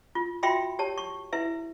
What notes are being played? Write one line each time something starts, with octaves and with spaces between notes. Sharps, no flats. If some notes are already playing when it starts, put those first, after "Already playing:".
F4
F4 F#4 E5 G5 B5 C6
G4 C#5 A5
C#6
E4 B4 E5